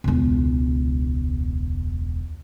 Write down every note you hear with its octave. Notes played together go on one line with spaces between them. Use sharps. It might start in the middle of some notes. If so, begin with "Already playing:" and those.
E1 C#2